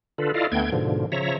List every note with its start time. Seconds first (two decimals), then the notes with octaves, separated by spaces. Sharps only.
0.18 D3 F4 A4 B4
0.34 E4 F4 A4 D5 D#5 F5
0.52 D2 A3 B3 G5 G#6
0.72 G#2 B2 D3 F3
1.12 C#3 F3 C#5 E5 A#5